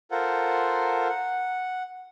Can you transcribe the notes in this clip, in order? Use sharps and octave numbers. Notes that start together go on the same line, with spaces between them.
F4 A4 A#4 C5 F#5
F#5